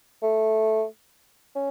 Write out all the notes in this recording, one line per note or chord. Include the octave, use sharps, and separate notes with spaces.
A3
C#4